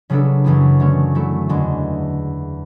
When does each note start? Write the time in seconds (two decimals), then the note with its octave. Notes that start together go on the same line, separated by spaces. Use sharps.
0.10 C#3 F#3 B3 D4 A4
0.44 F#2 E3 B3 E4
0.80 D3 A3 C#4
1.15 F#3 A3 E4 A4
1.49 E2 D3 G#3 D4